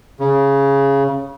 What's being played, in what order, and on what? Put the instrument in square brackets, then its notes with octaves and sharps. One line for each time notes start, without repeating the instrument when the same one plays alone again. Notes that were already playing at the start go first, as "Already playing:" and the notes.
[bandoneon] C#3